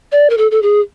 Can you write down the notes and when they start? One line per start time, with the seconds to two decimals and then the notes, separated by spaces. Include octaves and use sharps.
0.12 D5
0.30 A#4
0.37 A4
0.51 A4
0.62 G#4